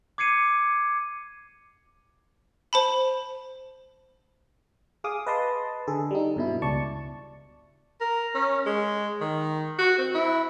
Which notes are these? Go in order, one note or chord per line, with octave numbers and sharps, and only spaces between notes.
D6 G#6 C7 C#7 D#7
C5 A5 B5
G#4 F5 D6 D#6
B4 D#5 A5 C6
D3 G#4 A4
G3 D#4
G2 B2 E4
C#2 D5 A5 C#6
A#4
C#4
G#3
D#3
F#4
C4
E4